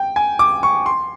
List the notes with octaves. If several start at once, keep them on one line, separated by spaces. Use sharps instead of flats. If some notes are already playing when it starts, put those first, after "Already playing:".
Already playing: G5
G#5
D6
C#6
C6